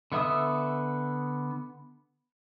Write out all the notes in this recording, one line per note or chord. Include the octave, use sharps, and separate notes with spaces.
D3 B3 E5 D#6 E6